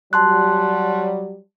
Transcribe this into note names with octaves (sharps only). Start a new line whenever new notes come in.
F#3 G3 A5 C6 F#6